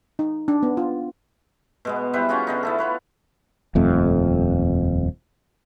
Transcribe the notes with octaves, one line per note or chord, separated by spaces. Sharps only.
D#4
D4
B3
F4
B2 G#3 B3
G3 E4 B4 C5
C#4 F4 F#4 G#4
D3 B3 D#4
B3 E4 A4
F4 B4 C#5
D#1 F2 A3